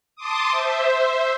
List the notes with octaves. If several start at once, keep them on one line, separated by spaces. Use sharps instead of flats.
A5 C6 D6 D#6
C5 E5